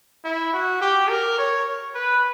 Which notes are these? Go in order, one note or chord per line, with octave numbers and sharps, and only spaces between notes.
E4
F#4
G4
A#4
C#5
B4